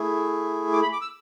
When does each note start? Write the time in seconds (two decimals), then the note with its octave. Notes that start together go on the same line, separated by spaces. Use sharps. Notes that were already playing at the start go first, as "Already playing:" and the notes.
Already playing: A3 E4 G#4
0.73 D6
0.82 B5
0.93 D6
1.01 E6